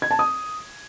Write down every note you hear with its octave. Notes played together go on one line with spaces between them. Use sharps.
G#6
A5
D#6